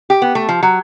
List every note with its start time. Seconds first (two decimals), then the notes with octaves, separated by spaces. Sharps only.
0.10 G4
0.22 B3
0.35 A3
0.49 F3
0.63 F#3